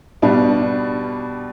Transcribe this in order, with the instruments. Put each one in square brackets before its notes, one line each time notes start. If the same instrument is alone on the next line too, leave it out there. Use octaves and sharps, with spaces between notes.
[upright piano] B2 G3 D4